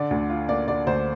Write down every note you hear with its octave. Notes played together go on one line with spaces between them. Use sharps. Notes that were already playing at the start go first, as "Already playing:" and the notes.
Already playing: D3 D5
D2
F4
A#3 D5
D3 D5
D2 C5